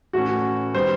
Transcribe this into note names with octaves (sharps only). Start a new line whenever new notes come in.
A2 E3 A3 C#4 F#4
D#3 G3 B3 C5